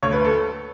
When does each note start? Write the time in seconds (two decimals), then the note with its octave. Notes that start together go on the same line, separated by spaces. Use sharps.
0.02 D2 C#5
0.13 B4
0.25 A4